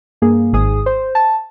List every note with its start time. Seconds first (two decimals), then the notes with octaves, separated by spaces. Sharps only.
0.22 G2 A#3 G#4
0.53 G#1 G#2 G#4 D#6
0.86 C5
1.15 A5